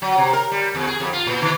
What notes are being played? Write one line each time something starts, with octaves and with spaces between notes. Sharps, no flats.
F#3
C3
A#4
G3
E2
G#4
F2
F4
A#2
D#3